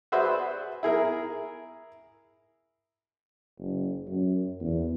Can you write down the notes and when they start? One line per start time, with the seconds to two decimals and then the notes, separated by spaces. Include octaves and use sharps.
0.12 F#4 G#4 B4 C5 D5 E5
0.83 E4 G#4 A#4
3.59 F#1
4.08 F#2
4.61 E2